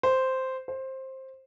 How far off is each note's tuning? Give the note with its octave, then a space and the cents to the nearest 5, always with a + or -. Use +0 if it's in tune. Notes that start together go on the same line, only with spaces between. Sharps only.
C5 -5
C5 +15